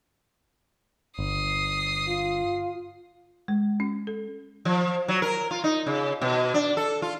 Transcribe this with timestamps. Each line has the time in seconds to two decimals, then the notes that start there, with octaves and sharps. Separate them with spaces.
1.19 G1 D#6 C7
2.07 F4
3.48 G#3
3.80 C#4
4.07 A4
4.65 F3
5.08 F#3
5.22 A#4
5.51 F4
5.64 D#4
5.86 C#3
6.21 B2
6.54 D4
6.77 A4
7.02 F4